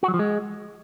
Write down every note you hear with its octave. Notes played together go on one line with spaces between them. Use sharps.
F#4
F#3
F3
G#3